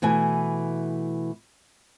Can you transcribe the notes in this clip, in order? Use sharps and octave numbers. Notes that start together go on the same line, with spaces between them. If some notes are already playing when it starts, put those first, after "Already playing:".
B2 E3 A3 G#5